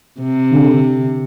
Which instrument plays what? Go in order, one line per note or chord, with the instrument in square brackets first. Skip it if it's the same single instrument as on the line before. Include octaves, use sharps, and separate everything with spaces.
[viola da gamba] C3
[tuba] D3